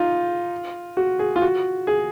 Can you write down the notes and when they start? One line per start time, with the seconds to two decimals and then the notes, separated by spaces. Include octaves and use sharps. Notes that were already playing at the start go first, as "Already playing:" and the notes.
Already playing: D#4 F4
0.97 F#4
1.19 G#4
1.36 F4
1.42 F#4
1.87 G#4